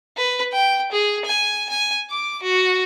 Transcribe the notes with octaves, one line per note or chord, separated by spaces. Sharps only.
B4
G5
G#4
G#5
G#5
D6
F#4